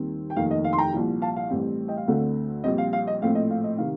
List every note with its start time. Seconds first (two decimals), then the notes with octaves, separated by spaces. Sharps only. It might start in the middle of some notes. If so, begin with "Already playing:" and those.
Already playing: D#2 D#3 G3 C4
0.30 G5
0.36 F1 D#2 D#3 F5
0.51 D#5
0.64 F5
0.73 C6
0.78 G5 A#5
0.93 C2 A#2 F3
1.22 F5 A5
1.36 F5
1.50 A1 A2 G3 C4
1.88 D#5 G5
1.97 F5
2.08 D2 D3 A3 C4
2.64 A#1 A#2 G3 C4 D#5
2.78 F5
2.93 F5
3.07 D#5
3.22 A#1 A2 A3 C4 F5
3.35 D#5
3.51 F5
3.64 D#5
3.78 C3 D#3 F5